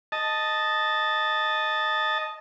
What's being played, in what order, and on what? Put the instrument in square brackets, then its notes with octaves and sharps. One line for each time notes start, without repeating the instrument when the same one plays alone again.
[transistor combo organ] D#5 A5